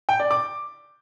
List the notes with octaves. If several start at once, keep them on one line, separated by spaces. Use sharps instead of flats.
G5
D5
D6